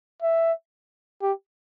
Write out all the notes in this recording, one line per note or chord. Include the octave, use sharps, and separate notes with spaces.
E5
G4